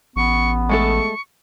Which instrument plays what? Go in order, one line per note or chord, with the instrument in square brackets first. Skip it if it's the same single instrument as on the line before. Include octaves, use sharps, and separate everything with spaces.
[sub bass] A1 [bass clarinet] B3 [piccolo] C#6
[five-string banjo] G#3 A3 A4 [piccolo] C#6